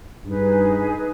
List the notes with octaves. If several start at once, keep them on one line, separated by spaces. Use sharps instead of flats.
G2 D#4 G#4 B4